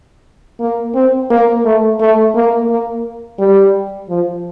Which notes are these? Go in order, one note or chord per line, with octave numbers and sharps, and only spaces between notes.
A#3
C4
A#3
A3
A3
A#3
A#3
G3
F3